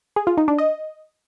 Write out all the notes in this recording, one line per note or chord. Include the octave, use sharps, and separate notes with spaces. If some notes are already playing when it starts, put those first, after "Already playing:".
G#4
F4
D#4
D4
D#5